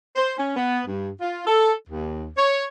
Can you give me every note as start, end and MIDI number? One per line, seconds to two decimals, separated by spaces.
0.16 0.33 72
0.37 0.54 61
0.56 0.82 59
0.87 1.10 43
1.21 1.42 65
1.46 1.73 69
1.89 2.28 39
2.37 2.65 73